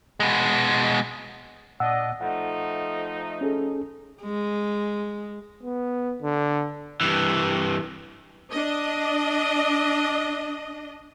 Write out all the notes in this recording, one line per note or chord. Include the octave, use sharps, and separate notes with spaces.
B2 G#3
A#2 D4 D#5 F#5 E6
F3 A3 D#4 F#5
C#4 G#4 A4
G#3
B3
D3
G2 E3
D4 D#5